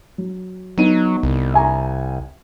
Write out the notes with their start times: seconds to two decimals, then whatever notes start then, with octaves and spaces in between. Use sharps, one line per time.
0.18 F#3
0.78 F#3 B3 D#4 D#7
1.23 C2
1.54 E5 G#5 A#5